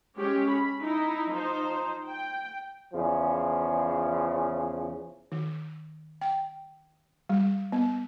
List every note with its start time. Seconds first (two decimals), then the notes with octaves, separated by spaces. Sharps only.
0.18 G#3 C#4 G4
0.51 B5
0.83 D#4 E4
1.32 F3 D#4 C5
2.07 G5
2.93 E2 C#3 F3
5.32 D#3
6.21 G5
7.29 G3
7.72 B3